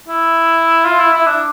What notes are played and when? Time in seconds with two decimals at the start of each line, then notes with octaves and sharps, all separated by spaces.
0.08 E4
0.85 F4
0.99 E4
1.13 E4
1.27 D4